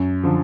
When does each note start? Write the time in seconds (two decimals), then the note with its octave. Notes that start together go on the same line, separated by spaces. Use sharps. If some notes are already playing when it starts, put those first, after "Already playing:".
Already playing: F#2
0.24 D3 F3